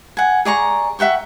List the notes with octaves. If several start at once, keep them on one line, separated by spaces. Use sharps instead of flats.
F#5 G#5
G#4 D5 A#5 C#6
E5 F#5 G5 C#6